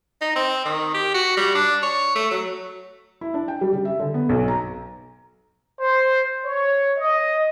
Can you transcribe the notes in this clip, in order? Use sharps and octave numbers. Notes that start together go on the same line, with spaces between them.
D#4
C4
D#3
G4
F#4
G3
D4
C#5
A3
F#3
E4
D4
G5
G3
C#3
E5
D3
B3
B1
A#5
C5
C#5
D#5